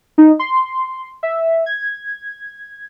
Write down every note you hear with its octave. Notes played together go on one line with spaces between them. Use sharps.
D#4
C6
E5
G#6